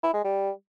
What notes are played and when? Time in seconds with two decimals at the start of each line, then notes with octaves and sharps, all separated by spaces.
0.03 E4
0.14 G#3
0.24 G3